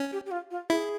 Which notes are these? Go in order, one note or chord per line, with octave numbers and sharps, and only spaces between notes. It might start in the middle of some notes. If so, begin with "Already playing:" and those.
Already playing: C#4
G4
G4
F4
F4
E4 G#4